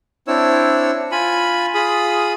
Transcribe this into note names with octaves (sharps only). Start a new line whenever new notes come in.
C4 D4 E4 C#5 E6
F4 G#5 B5
F4 G#4 B5 D#6